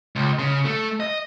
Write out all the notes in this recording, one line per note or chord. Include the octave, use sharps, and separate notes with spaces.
C#2
C#3
A3
D#5